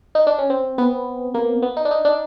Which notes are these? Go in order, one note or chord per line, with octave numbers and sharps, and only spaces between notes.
D#4
D4
C#4
C4
B3
A#3
B3
D#4
D4
D#4
D4